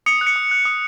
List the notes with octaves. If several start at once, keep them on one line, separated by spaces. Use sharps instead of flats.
D#6 C#7
F#6
C#7
D#6
F#6
D#6